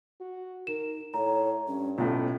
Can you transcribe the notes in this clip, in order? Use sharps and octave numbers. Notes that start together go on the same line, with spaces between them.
F#4
D#4 A#4 E7
A2 C#5 A#5
G2 C#4
B1 A2 C#4 F4